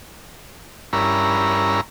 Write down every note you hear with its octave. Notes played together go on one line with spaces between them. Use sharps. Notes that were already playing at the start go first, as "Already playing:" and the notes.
G2 C#4 E4 A#4 A#5 B5